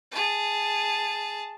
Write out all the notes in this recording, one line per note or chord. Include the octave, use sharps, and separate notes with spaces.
G#4 A5